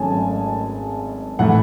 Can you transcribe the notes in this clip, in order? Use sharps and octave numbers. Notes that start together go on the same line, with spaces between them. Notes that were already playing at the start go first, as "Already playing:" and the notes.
Already playing: G#1 G#2 F#3 A3 C#4 G#5 A5
A2 E3 A3 F#5